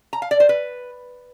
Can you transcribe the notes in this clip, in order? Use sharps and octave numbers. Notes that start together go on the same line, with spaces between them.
A#5
F5
D5
C5
B4